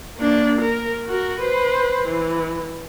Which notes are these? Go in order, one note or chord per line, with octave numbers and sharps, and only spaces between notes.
A#3 D4
A#4
F#4 A#4
B4 C5
E3